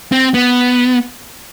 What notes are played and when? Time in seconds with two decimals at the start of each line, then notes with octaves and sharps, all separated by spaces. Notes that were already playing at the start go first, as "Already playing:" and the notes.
0.12 C4
0.34 B3